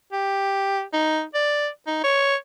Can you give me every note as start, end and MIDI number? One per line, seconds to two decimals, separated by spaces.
0.12 0.82 67
0.93 1.23 63
1.35 1.68 74
1.87 2.02 63
2.04 2.36 73